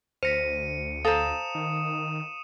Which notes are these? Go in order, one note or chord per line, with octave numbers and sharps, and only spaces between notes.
D2 C5 A#6 B6 C#7 D#7
A4 C5 F5 A#5 D#6 E7
D#3